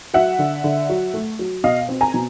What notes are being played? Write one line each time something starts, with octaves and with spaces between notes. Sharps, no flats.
F#3 E5 F#5
D3
D3
F#3
A3
F#3
B2 D#5 F5
C4
G#5 A#5
B2